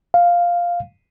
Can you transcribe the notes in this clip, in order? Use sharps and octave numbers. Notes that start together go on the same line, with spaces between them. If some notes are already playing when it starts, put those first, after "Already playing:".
F5